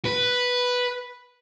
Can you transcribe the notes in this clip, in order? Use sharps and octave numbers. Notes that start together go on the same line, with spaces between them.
B4